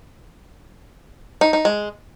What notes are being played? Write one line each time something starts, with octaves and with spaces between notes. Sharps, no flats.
D#4
D#4
G#3